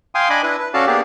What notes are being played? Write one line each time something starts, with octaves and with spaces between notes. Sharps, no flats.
F5 G5 G#5 C6 D#6
D4 D#5 G#5 B5 D6
D4 E4 B4
B4
C#4 F#4 A4 D5 F5 A5
A#3 B3 D4 G4 G#4 D5